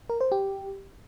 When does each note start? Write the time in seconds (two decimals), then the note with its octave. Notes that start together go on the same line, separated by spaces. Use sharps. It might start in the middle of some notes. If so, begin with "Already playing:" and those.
0.10 A#4
0.21 C5
0.32 G4